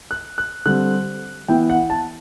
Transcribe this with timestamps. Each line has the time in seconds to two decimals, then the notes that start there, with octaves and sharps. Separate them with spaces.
0.11 F#6
0.38 F#6
0.66 D3 G3 C4 F#6
1.48 E3 B3 E4 G5
1.70 F#5
1.90 A5